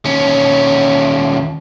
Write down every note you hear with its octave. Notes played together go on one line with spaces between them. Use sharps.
D#2 C#4